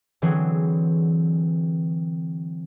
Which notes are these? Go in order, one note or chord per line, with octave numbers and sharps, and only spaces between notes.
D3 E3 F#3 C4 G#4